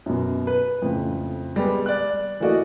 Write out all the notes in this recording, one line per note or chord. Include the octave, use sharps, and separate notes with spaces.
F#2 B2
B4
F2 A2 C#3
G3 G#3 B3
D5 F#6
E3 A3 A#3 F#4 D5 D#5